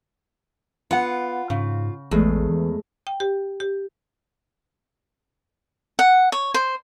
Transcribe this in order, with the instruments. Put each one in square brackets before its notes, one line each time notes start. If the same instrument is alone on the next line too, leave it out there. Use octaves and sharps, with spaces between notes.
[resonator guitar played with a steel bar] B3 F#5 [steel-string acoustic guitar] F4
[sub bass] G#2 [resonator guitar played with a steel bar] C#3
[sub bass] A1 [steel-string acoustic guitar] E2 [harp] G#3 A3
[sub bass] E3
[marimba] G5
G4
G4
[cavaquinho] F#5
C#5
C5